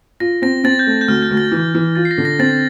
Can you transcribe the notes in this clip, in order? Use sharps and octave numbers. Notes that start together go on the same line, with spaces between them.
F4 A#6
C4 A#6
C4 A6
G6
A3
G6
D2 F6
G6
D2
A6
E3
E3
F4 A6
C7
A#6
D3
A#6
C4 A6